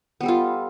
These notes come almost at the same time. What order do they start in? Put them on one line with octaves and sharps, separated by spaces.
B3 G3 A4 F4